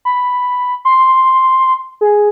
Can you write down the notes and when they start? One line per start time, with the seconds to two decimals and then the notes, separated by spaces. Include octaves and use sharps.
0.05 B5
0.85 C6
2.01 G#4